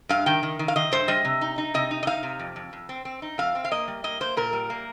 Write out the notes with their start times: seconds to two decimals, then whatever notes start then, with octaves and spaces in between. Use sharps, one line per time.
0.09 G2 F5
0.26 D#3 G5
0.43 D#3
0.59 D#3
0.68 F5
0.76 D#3 D#5
0.92 G2 C5
1.08 G3 D#5
1.25 C3
1.41 D#4
1.58 D#4
1.74 C3 D#5
1.91 D#4
2.03 D#5
2.07 D#4 F5
2.23 C3
2.40 F2
2.56 F2
2.73 F2
2.89 C4
3.05 C4
3.22 D#4
3.38 F2 F5
3.55 C4
3.64 F5
3.71 A#3 D#5
3.88 G3
4.04 A#3 D#5
4.20 A#3 C5
4.37 A#2 A#4
4.53 G3
4.70 A#3